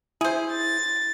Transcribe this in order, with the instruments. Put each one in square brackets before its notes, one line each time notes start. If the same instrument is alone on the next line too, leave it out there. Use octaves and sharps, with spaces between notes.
[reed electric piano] E4 [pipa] G#4 C5
[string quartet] A6